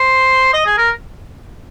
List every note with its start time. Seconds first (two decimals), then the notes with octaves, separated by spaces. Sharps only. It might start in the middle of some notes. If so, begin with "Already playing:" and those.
Already playing: C5
0.54 D#5
0.66 G#4
0.77 A#4